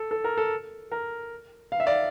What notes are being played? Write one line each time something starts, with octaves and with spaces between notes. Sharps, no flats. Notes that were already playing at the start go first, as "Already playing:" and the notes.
Already playing: A4
A4
A#4
A4
A#4
F5
E5
D5 F5